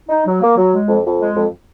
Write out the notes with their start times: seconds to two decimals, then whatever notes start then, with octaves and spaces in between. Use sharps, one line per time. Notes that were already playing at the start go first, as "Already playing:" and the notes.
0.09 D#4
0.26 F#3
0.42 A#3
0.57 F#3
0.72 G#3
0.88 F2
1.04 F2
1.20 G#3
1.35 F2